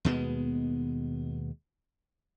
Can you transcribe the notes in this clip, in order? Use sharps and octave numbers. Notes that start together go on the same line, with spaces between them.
D#2 B2 G#3 B3